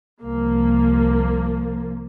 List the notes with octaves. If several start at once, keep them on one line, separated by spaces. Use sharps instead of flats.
C2 F3 A#3